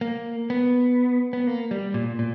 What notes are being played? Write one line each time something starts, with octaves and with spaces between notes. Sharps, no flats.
A#3
B3
B3
A#3
G3
A#2
A#2